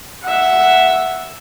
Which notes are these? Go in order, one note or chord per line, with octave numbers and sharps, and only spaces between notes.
E5 F#5